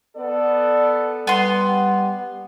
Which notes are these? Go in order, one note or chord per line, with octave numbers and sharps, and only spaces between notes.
B3 A4 D5
G3 B3 C6